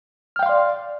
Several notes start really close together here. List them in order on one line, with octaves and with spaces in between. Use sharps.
F6 G5 F5 C6 D5